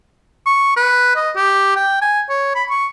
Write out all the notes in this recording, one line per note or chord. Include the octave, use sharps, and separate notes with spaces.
C#6
B4
D#5
G4
G5
G#5
C#5
B5
C#6